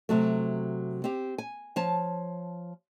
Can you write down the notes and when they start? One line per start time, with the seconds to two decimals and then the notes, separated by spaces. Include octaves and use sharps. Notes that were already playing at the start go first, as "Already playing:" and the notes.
0.09 C3 F#3 A3
1.04 C4 G4
1.38 G#5
1.76 F3 C#5 A5